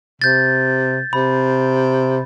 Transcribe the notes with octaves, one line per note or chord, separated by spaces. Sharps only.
C3 G6 A6
C3 B5